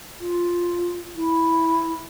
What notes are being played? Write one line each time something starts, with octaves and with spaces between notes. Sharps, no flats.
F4
E4